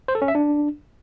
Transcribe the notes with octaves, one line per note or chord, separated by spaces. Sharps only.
C5
A4
C#4
E5
D4